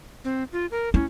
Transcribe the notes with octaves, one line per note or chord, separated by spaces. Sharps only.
C4
F4
A#4
C#4 E4